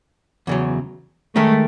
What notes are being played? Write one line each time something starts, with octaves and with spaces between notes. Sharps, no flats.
E2 C#3 F#3
D#3 G#3 A3 D#4